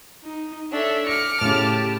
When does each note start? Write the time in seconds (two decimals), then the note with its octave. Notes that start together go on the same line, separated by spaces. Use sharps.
0.24 D#4
0.72 D4 A4 C#5 E5
1.07 D6 F6 A#6 C#7 F7
1.41 A2 C#3 G4 A5